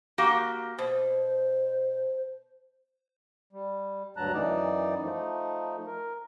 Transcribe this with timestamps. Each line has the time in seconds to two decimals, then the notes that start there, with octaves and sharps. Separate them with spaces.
0.18 A#3 F#4 G4
0.78 B2 C5
3.53 G3
4.17 D2 G2 F#3 A5 A#5 F#6
4.34 F#2 E3 D#4 D5
5.02 F3 A3 D#4
5.86 A#4